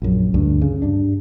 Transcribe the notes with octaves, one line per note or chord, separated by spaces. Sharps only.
A#1 F#2
D2 G2
C#3
G2 D4